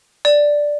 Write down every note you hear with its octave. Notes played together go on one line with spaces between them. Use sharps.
D5